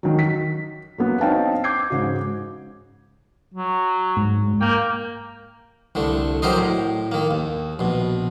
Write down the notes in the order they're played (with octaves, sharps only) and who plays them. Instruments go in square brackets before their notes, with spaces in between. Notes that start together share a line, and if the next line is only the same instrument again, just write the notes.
[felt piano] D#3 F#3
B6
F#3 A#3 B3
C4 D#4 C#5 F5 G5 A5
D6 G6 G#6 C7
G#2 C#3 F#4
[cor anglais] F#3
[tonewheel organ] G#2
[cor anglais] A#3 [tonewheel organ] G5
[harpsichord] C2 D3 A3
F#3 G4 A#4 C5 D#5
A2
D#3 A#3
D#2
A#1 B2